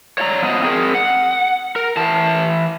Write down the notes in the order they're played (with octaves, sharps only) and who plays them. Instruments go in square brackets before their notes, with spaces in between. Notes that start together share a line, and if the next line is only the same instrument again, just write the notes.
[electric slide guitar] C#5 D5 F#5 A#5
F3 B3 D#5
C4 G#4 A#4
F#5
A#4
E3 A5